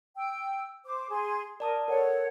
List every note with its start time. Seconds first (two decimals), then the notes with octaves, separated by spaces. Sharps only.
0.17 G5 E6
0.85 C5 D6
1.10 G#4 C6
1.60 A#4 D5 A5 D#6
1.88 A4 A#4 C#5 F#5